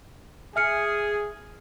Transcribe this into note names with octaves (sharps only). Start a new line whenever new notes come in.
G#4 E5 F6 C#7